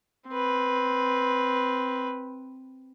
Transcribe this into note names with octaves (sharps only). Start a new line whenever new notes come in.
C4 B4